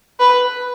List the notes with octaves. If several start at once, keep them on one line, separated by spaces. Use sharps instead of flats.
B4